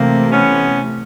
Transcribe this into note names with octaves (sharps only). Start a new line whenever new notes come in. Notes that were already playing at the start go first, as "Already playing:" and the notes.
Already playing: C3 E3 A3 A#3 C4
B3 C#4